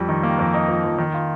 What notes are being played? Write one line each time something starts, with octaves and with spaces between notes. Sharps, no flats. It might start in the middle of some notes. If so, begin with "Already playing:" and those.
Already playing: F2 G3
D#3
A#3
F2
D#4
F3
F2
D#3
F4